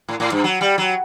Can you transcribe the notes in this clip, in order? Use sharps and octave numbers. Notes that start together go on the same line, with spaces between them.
A2
A2
G2
F#3
G3
F#3